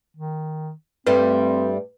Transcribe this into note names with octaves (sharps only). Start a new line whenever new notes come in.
D#3
G2 G3 A3 C4 B4